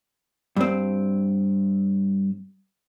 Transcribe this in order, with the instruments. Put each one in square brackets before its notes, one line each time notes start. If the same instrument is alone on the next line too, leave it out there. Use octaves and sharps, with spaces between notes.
[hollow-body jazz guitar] G2 C4